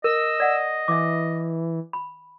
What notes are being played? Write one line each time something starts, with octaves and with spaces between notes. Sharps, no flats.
A#4 D#5 E6
D5 F#5
E3 E5 D6
B5